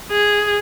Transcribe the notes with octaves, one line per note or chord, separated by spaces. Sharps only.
G#4